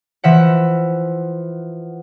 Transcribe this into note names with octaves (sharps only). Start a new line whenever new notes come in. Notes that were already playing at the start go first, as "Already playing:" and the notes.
E3 F3 E5 F#5